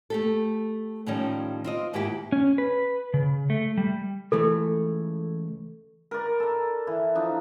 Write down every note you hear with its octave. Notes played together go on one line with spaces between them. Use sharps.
A3 G4 A4
A2 D#3 F3 G3 C#4
C4 F4 D#5
D#2 G#2 D#3 E4 G4 F#5
C#4
B4
C#3
A3
G3
C#2 E3 A3 A4
A#4 B4 D5
A4 D5
E3
F3 D4 D#4